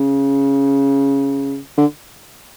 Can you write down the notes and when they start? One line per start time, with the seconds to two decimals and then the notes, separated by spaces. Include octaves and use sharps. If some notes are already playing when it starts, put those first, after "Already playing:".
Already playing: C#3
1.77 D3